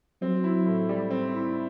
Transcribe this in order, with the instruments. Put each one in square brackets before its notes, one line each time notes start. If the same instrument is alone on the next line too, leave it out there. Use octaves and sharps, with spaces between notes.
[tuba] F#3 [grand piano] C4
[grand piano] E4
A2
G3
C4
E4